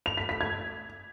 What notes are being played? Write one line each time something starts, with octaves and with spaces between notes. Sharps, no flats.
F7
B6
B6
G#6